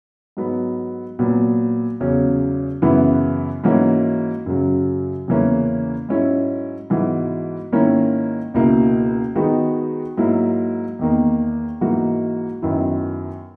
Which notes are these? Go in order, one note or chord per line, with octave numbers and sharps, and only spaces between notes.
G#2 F#3 B3
A#2 F#3 B3
E2 C#3 F#3 C#4
F#2 C#3 E3 B3 E4
G#2 E3 A#3 C#4 F#4
F#2 C#3 F#3
E2 C#3 E3 A#3 C#4
G#2 F#3 C#4 E4
G#2 E3 B3 F#4
G#2 D#3 A#3 C#4 E4
C#2 B2 A#3 E4
D#3 G#3 B3 D#4 F#4
G#2 F#3 A#3 E4
E2 D#3 A#3
G#2 E3 A#3 D#4 F#4
F#2 D#3 F#3 B3 E4